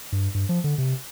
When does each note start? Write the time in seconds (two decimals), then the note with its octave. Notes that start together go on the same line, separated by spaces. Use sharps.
0.12 G2
0.35 G2
0.49 F3
0.64 D3
0.78 C3